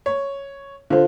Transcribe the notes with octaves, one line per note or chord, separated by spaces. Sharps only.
C#5
D3 F4 C5